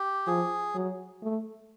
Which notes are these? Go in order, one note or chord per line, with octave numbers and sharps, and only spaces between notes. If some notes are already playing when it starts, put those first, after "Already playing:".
Already playing: G4
F3 G#4
F#3
A3